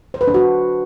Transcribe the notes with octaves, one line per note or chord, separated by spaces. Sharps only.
C5
B4
D4
F#4